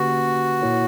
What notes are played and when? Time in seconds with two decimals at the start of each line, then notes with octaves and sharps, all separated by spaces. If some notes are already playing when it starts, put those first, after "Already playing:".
Already playing: D3 A#3 C#4 F#4 G4 B4
0.62 A#2 A#3 E4 A#4 C#5